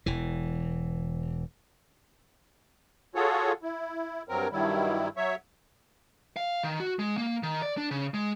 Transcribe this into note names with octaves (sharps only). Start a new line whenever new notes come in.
E1 E3
F4 F#4 G#4 A4 C#5
E4
G2 F#3 C4 A#4
G2 D#3 F#3 G3 E4
F#3 C#5 E5
F5
D#3
F#4
G#3
A#3
D#3
D5
D4
C#3
G#3